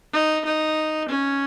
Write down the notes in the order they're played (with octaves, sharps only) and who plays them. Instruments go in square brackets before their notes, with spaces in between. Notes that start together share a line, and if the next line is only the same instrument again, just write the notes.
[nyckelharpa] D#4
D#4
C#4